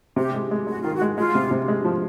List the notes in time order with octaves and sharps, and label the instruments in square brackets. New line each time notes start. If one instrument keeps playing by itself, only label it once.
[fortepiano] C3 [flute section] G4
[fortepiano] G#3
G#3
[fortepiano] G#3 [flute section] F#4
[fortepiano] D#3 [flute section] F4
[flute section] F#4
[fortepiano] G#3
[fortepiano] G#3 [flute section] F4
[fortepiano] C3
C3
G#3
F3